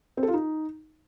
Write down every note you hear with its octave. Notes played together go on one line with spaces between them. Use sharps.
C4
A4
F4
D#4